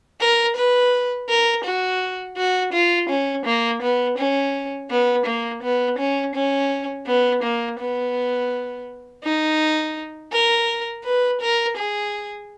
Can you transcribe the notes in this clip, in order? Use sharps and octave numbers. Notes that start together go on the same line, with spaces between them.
A#4
B4
A#4
F#4
F#4
F4
C#4
A#3
B3
C#4
B3
A#3
B3
C#4
C#4
B3
A#3
B3
D#4
A#4
B4
A#4
G#4